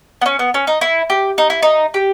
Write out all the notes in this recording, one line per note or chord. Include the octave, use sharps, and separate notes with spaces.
B3
C#4
B3
C#4
D#4
E4
G4
D#4
E4
D#4
G4